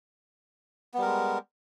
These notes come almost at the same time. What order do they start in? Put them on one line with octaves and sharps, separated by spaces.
B3 G3 A#4 G#3